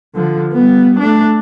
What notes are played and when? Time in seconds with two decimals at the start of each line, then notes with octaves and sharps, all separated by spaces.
0.14 D3 F3
0.53 G3 B3
1.00 A3 D4